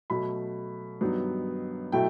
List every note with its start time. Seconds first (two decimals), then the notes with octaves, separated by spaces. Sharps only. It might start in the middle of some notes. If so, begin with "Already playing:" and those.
0.10 B2 F#3 A3 B5
1.01 G2 D#3 F#3 B3 D#4
1.92 B2 F#3 A3 E4 G5